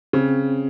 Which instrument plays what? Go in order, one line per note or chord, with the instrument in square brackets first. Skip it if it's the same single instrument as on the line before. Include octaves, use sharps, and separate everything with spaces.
[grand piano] C#3 [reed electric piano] C4